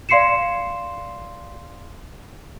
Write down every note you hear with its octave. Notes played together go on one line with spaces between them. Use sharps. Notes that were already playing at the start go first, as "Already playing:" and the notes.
D5 F5 C6 C7 C#7 E7